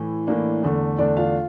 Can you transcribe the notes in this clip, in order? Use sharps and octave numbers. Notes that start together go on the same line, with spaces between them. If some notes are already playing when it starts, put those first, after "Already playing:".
Already playing: A2 E3
A2 E3 A#3 D4
E2 D3 A3
E2 D3 A3 D4 D5
F4 F5